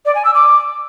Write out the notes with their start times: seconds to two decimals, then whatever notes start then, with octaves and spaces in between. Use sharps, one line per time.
0.06 D5
0.15 G#5
0.25 E6
0.35 D6